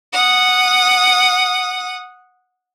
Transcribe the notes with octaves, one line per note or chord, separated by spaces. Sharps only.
F#5 D#6